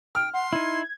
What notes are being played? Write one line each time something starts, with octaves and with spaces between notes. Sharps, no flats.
G5 F6
F#5 C6
D#4 E4 G#6